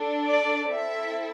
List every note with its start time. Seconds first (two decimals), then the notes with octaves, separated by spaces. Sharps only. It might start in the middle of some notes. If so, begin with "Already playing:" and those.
Already playing: D4 A4
0.26 D5
0.69 C4 E4 A4 E5